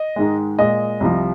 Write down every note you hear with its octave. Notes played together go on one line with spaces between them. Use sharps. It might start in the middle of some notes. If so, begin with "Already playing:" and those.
Already playing: D#5
G#2 D#3 G#3
A#2 G#3 D#5
C2 C3 F3